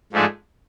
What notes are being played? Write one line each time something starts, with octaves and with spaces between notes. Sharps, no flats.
G#2 F3 A3 D4 G#4